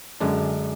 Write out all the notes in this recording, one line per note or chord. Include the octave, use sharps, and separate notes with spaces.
F#2 D3 G#3 D4